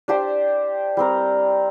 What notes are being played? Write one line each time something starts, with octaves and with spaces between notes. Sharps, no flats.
D4 G4 C5
G3 C4 A#4